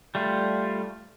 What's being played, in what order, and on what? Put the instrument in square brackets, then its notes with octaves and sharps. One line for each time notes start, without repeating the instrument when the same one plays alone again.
[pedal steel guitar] G3 A3 F4